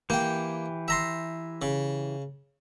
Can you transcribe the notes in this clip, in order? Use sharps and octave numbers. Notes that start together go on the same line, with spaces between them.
E3 A#3 G4 G5
E5 A#5 C6
C#3